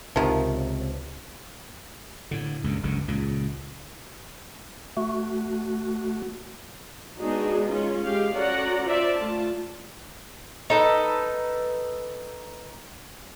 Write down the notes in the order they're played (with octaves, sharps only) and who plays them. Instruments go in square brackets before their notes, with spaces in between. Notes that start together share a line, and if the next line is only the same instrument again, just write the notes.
[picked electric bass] C#2 C3 [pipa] D#3 F3
[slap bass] A2 D3
C#2 G2 A#2
F#1 C#2 G2 D3
C#2 A#2 C#3
[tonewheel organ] A3 F#4
[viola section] G#3 B3 D4 D#4 F#4 G#4
G#3 C#4 F4
G#3 G4 F5
C#4 F#4 A4 D5 F#5 A#5
F4 C5 D5 E5
A3 F4 A5
[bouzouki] D#4 A4 B4